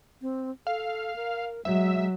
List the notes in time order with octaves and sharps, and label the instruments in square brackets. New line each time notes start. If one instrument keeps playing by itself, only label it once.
[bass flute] C4
[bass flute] A4 [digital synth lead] F5
[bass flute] A#4
[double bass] F#3 [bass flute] G#3 [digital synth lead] E5